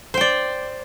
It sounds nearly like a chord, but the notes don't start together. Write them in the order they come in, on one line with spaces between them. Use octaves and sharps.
C5 G5 D5